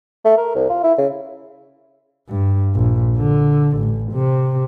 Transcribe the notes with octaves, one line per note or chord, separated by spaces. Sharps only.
A3
A#4
C2
F4
E4
C#3
G2
A#1
D3
A1
C3